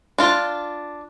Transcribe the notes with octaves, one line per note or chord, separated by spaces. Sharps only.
D4 F4